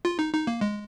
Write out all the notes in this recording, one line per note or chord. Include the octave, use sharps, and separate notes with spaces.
F4
D#4
D#4
A#3
G#3